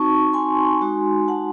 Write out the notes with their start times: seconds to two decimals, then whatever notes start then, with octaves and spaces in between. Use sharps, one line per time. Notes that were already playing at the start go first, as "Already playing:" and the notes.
Already playing: C4 D#4 F#4 A5 C#6
0.33 G#5 C6
0.81 G#3 D#4 F#4
1.28 F#5 A5